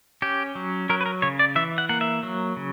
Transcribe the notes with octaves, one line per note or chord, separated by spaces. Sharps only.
C#4 G4
F#3
F#3 A#4
B4
A#4
C#3 C#5
D5
E3 E5
F#5
A#3 F#5
E5
F#3
C#3